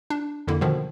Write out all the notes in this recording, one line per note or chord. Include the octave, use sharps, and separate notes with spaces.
D4
F2 D3 A#3 E4
B2 D3 D#3 F3